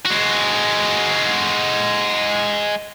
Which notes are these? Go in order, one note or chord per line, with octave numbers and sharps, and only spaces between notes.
G#3 F#4